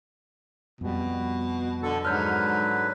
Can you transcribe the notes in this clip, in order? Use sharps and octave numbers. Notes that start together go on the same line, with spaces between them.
F2 B2 G3
B2 D3 A4
G#2 D3 F#3 B4 F6 G6